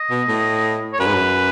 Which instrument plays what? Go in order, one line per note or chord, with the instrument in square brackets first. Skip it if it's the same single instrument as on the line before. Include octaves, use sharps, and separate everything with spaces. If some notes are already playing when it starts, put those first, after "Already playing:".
Already playing: [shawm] D#5
[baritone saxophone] B2
A2
[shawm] C#5
[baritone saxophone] F#2 [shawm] B4
[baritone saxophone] G#2
F#2